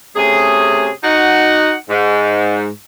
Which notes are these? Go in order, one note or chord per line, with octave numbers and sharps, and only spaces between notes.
C3 A3 C#4 G#4
D#4 F#4 F#5
G#2